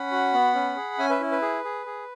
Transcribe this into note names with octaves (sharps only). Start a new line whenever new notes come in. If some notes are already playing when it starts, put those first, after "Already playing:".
Already playing: C#4 F#5 B5
F#4
B3
C#4
G#4
C#4 E5 G#5
B4 E5
E4
B4
G#4
G#4
G#4